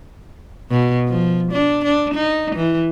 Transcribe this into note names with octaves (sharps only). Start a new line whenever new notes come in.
B2
F3
D4
D4
D#4
E3